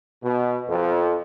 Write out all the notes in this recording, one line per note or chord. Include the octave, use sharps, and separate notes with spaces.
B2
F2